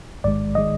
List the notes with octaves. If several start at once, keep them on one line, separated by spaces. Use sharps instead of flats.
A1 G#2 D#3 G#3 D5
D#3 G#3 D#5